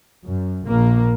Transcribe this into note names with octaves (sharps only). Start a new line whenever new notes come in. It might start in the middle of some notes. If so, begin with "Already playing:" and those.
F#2
A#1 A#3